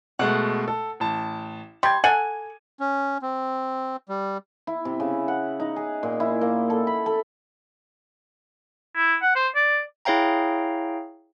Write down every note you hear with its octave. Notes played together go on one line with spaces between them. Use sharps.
B2 G#3 A3 F#5
A4
A1 A5
G3 C6 G#6
A4 F#5 G#5 D#7
C#4
C4
G3
E4
C3
C#3
F#5
D#4
G#4
A#2
E4
A#3
A4
B5
A4
E4
F#5
C5
D5
E4 G#4 C#5 F5 G5 A#5